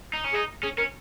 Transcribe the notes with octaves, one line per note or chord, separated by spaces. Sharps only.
D#4
C#4
D#4 G#4
C#4 G#4
C#4 A#4